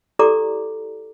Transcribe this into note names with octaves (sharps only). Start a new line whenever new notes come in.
E4 G4 A4 D5 A#5 D6